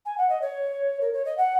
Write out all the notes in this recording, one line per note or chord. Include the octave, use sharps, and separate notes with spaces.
G#5
F#5
D#5
C#5
A#4
C#5
D#5
F#5